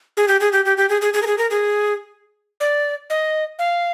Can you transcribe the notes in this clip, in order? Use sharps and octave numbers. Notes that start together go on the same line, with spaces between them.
G#4
G4
G#4
G4
G4
G4
G#4
G#4
G#4
A#4
G#4
A#4
G#4
D5
D#5
F5